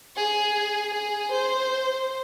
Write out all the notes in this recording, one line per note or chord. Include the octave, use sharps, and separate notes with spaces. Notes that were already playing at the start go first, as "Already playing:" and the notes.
G#4
G#4
C5